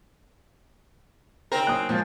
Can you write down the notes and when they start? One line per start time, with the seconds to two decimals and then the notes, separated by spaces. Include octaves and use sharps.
1.52 C#3 C4 D#4 A#4
1.67 F#3 A#3 D#4 D#6 F#6
1.89 A#2 F3 G#3 C#4